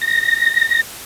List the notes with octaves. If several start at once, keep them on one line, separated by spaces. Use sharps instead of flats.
A#6